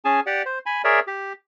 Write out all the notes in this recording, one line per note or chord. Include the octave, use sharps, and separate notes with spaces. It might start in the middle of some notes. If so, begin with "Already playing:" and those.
C#4 G#4 G#5 A5
G4 D5 F#5
C5
G#5 B5
G#4 A#4 C#5 D5 E5
G4